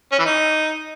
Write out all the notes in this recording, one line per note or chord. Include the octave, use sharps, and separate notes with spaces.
C#4
E3
D#4